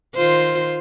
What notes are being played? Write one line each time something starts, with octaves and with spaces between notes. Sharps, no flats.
D#3 F4 C5